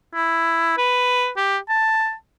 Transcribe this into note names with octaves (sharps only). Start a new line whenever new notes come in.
E4
B4
G4
A5